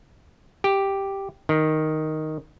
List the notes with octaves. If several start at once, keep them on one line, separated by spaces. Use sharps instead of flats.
G4
D#3